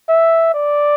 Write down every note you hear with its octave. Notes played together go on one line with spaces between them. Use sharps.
E5
D5